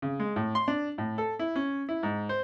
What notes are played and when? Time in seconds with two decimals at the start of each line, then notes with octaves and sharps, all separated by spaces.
0.02 C#3
0.20 G#3
0.36 A2
0.55 C6
0.68 D4
0.98 A2
1.18 A4
1.39 E4
1.56 C#4
1.89 E4
2.03 G#2
2.29 C5